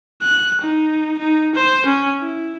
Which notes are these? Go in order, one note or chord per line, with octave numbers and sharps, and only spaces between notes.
F#6
D#4
D#4
C5
C#4
E4